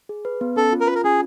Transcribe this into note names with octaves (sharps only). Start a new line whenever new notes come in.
G#4
B4
B3
C#4 A4
F4
A#4
F4 B4
A#4
C#4 G#4